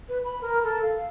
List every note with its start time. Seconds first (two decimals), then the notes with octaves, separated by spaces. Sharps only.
0.09 B4
0.24 B5
0.41 A#4
0.64 A4
0.83 F5
0.96 F5